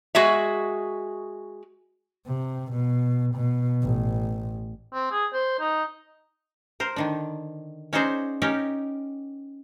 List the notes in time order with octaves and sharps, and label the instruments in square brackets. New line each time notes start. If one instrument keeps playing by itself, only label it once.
[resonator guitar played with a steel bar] G#3 F#4 G#4 E5
[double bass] C3
B2
B2
A1
[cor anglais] C4
G#4
C5
D#4
[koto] A#4 C5
D3 D#3 D4
C#4 D#4 F#4 G#4 C5 D5
C#4 D#4 G4 A#4